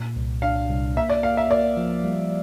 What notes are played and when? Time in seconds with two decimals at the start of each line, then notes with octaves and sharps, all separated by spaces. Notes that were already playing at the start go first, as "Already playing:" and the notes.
Already playing: A#2
0.16 C2
0.42 D4 F5
0.69 C2
0.96 A#3 E5
1.10 D5
1.23 A#3 F5
1.37 E5
1.50 A#3 D5
1.77 F3
2.04 G3